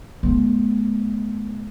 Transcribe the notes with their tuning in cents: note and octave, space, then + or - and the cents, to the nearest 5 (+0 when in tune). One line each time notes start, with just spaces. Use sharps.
G#3 +35 B3 -30